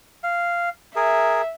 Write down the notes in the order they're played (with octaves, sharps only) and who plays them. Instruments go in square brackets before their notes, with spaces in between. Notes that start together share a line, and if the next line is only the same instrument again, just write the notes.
[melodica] F5
[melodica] G#4 A#4 [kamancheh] E5